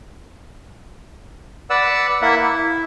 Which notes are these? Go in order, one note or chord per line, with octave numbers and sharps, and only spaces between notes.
B4 D5 F#5 E6
A#3 E4 E5 F#5
E4